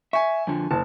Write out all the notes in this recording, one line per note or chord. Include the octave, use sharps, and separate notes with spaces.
E5 G#5 C#6
F2 D3 F3
F#1 A5